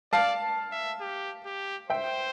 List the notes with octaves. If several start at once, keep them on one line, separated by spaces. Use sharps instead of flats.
D5 F5 A5
E5
G4
G4
C5 E5 G5